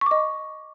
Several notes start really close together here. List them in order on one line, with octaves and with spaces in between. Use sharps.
C#6 D6 D#5